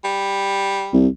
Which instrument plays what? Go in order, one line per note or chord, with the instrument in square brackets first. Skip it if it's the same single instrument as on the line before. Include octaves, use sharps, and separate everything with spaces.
[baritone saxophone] G3
[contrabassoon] C2